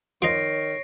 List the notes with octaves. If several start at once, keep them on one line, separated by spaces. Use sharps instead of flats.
D#3 F3 D#4 C#5 A#6 C7 D7